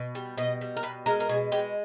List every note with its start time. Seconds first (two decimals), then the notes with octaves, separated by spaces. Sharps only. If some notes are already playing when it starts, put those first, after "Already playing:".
Already playing: B2
0.15 G3
0.37 B2 D#5
0.61 G3
0.77 A#4
0.83 B2 B4
1.06 G#3 A#4
1.20 A#4
1.29 B2 G#4
1.52 G#3 G4